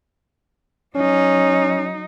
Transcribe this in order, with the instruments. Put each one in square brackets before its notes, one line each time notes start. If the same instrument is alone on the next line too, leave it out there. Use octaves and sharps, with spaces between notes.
[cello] F#3 D#4 [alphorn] C#4